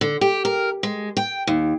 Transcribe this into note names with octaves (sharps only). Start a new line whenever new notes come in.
D3
G4
A#4
G#3
G5
D#2